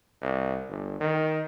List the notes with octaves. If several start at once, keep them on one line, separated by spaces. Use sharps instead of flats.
C2
G1
D#3